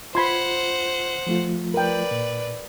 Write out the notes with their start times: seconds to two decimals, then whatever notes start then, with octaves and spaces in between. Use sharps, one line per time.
0.15 F4 C5 F#5 B5 C6 G#6
1.27 F3 A3 F4
1.74 A#4 B4 D5 G5
2.11 A#2